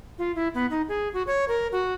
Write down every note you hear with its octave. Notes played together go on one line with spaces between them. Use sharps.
F4
E4
B3
D#4
G#4
F#4
C#5
A#4
F#4